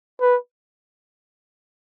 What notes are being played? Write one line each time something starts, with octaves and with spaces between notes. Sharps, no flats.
B4